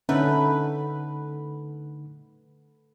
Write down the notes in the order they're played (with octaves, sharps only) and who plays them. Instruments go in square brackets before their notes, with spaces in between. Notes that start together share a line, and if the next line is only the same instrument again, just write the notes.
[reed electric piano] D3 D#4 F#5 [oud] A3 [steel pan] C#4 E5 A#5 [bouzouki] B4